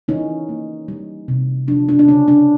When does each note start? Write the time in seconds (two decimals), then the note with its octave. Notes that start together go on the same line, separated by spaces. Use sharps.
0.08 E3 C#4 D#4
0.49 A#3
0.88 G3
1.28 C3
1.68 F3 D4
1.89 D4
1.99 D4
2.08 C#3 C#4
2.28 D4